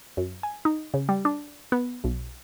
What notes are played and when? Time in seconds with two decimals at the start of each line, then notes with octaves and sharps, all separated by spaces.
0.17 F#2
0.43 G#5
0.65 D#4
0.94 C#3
1.09 G3
1.25 D4
1.72 B3
2.04 B1